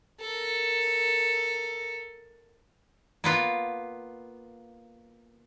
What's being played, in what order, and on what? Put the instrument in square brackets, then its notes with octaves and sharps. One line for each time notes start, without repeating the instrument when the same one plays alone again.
[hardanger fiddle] A4 A#4
[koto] A#3 B3 F4